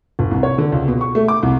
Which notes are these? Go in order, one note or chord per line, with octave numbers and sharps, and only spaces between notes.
G1
C2
C#5
D3
C#2
B2
C#6
A3
D6
C2